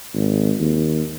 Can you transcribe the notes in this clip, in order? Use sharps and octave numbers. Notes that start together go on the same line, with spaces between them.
G#1
D#2